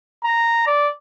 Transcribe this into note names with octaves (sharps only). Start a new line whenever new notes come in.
A#5
D5